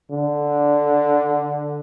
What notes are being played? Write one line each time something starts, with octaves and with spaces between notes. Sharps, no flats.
D3